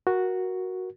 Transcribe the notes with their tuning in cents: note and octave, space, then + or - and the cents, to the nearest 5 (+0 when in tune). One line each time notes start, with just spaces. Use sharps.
F#4 +0 A#4 +15